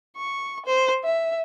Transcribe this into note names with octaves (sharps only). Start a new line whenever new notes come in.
C#6
C5
E5